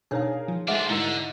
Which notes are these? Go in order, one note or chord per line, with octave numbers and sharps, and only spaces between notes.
B2 D4 D#4 G#4 A#4 C#5 F5
F3
G#3 A3 D4 F4 B4 E5 F#5
G#2 D3 E4 A#4 A6